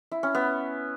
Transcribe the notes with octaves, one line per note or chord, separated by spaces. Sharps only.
E4
C#4
B3